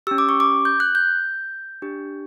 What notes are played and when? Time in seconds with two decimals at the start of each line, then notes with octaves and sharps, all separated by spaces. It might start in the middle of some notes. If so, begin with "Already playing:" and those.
0.07 G4 E6
0.11 C#4
0.18 D6
0.29 C#6
0.40 D6
0.65 G6
0.80 F#6
0.95 G6
1.82 D4 G4